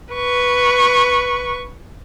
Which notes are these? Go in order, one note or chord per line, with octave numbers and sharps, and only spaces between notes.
B4 C#6